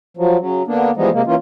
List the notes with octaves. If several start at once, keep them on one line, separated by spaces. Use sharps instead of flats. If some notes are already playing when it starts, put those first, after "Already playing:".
F3 F#3
C#3 F#3
D3 A#3 B3 D4
E3 F3 G3 G#3 B3 D#4
C3 G#3 A#3
E3 A#3 C#4 F4